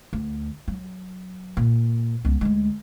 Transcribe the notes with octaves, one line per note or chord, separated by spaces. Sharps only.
D2
F#3
A#2
C#2 B3
D2 G#3